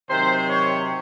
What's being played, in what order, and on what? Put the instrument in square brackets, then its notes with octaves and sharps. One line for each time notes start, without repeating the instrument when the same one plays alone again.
[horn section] C3 D#3 F#3 C5
C#5